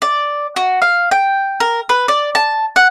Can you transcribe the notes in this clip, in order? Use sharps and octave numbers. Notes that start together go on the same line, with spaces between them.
D5
F#4
F5
G5
A#4
B4
D5
A5
F#5